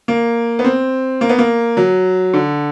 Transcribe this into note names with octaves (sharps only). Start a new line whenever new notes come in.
A#3
B3
C4
A#3
B3
A#3
F#3
D3